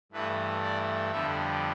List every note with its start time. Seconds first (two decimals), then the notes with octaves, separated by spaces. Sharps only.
0.12 G2 E3 A3 B4
0.63 D5
1.11 F2 D3 G3 B3 E5